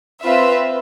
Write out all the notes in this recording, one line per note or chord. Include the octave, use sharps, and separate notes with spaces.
C4 F4 B4 E5